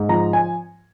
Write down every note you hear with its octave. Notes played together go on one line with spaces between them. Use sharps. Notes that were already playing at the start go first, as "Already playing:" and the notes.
Already playing: G#2
F3 A#5
G#5